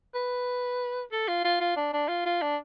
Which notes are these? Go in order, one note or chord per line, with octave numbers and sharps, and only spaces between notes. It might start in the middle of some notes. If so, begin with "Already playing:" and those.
B4
A4
F4
F4
F4
D4
D4
F4
F4
D4